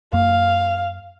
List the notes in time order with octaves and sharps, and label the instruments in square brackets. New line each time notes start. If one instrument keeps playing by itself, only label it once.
[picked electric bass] F#2 A#3 [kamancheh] F5